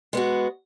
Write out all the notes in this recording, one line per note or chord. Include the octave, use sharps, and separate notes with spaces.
G#3 B3 F#4